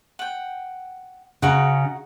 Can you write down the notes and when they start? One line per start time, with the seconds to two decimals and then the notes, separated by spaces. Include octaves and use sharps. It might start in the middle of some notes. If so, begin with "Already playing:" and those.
0.19 F#5 G5
1.42 C#3 D#4 F#4 F#5